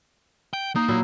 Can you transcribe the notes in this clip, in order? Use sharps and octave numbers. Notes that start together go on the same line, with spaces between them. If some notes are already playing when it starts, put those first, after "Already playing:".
G5
A#3 D#4
A#2 F#3 E4